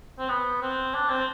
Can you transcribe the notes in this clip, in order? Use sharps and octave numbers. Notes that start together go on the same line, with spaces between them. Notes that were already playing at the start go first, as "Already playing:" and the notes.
C4
B3
C4
D4
C4